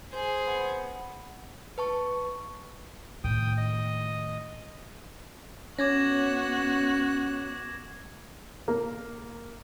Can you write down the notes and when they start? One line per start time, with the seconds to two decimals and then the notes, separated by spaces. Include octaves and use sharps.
0.13 G#4 C5
0.47 B3
1.78 B4 A5 C#6
3.24 A2 D#3 G5 D#6
3.58 D#5
5.79 B3 C#4 F#4 D6 F#6 G#6 A#6
8.68 A#3